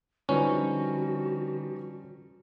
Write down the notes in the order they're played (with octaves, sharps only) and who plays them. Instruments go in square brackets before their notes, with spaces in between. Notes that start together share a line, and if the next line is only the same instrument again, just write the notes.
[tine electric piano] D3 B4 [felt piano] F3 G3 D#4 [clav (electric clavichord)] C#4 [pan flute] F#4